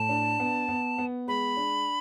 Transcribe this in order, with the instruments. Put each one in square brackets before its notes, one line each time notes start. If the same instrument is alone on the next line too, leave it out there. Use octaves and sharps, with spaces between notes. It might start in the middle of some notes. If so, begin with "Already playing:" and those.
Already playing: [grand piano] A2 [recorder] A5
[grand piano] D4
B3
B3
B3
[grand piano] G#3 [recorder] B5
[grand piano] D4